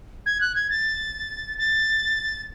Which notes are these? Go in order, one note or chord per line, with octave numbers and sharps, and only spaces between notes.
G#6
F#6
G#6
A6
A6